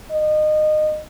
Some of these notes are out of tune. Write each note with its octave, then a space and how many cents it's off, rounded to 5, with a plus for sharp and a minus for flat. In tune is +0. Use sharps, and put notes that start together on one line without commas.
D#5 -25